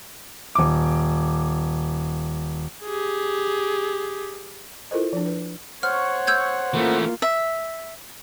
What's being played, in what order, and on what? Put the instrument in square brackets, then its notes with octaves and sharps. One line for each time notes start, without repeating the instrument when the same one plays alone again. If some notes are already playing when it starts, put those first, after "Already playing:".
[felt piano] D#1 D6
[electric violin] G4 G#4
[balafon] E4 F4 A4 A#4 C5 D#5
F3 D4
B4
[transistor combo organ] C5 F#5 [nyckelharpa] C#5 C#6 [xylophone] F6
[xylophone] E6 G6 G#6
[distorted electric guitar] E3 A3 [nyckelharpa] A#3 F4
[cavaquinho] E5